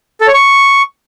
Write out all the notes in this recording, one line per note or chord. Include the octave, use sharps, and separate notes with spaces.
A4
C#5
C#6